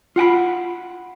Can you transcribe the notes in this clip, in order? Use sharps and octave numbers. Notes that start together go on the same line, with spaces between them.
F4 F#5 G5 B5